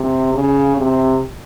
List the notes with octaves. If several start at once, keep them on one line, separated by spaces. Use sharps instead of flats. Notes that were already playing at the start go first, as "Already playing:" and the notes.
Already playing: C3
C#3
C3